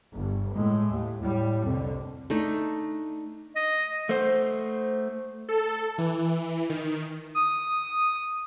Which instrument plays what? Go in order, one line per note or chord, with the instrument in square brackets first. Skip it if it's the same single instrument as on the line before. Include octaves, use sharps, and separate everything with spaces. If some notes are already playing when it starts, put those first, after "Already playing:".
[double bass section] G1
[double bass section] A2 [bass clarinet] G#3
[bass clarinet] D#2
[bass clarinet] A2 [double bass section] G3
[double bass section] C2 D3 [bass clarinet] F2
[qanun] A3 D4 D#4
[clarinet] D#5
[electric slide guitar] A3 C5
[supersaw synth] A4
E3
D#3
[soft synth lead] D#6